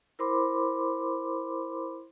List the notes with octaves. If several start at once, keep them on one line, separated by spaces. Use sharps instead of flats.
E4 A#4 C5 B5 C6 D6